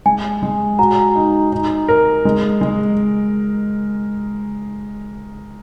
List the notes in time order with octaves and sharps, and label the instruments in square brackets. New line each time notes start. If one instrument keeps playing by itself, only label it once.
[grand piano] G#3 [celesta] G#5
[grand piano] G#3
[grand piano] F#4 [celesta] A#5
[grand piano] D#4
D#4
A#4
G#3
G#3